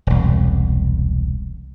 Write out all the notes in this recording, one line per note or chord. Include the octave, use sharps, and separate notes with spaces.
E1 C2